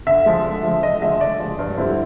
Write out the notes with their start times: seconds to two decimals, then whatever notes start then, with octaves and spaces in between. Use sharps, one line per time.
0.07 D3 E5
0.26 F3 G#3
0.45 D3
0.63 F3 G#3
0.83 D3 D#5
1.02 F3 G#3 E5
1.21 D3 D5
1.40 F3 G#3
1.59 G2
1.77 D3 G3 C4 E4